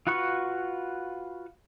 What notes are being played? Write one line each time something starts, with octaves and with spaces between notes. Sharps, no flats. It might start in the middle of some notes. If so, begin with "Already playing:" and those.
F4 F#4 B4 C#6